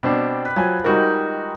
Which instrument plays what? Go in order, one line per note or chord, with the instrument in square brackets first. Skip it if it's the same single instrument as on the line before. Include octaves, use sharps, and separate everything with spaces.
[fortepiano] B2 C4 D4 [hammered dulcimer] G3
[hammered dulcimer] B4
[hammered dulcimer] F3 [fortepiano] F#3 G#5
[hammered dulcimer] D#3 G#3 D#4 [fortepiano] G3 F#4 A#4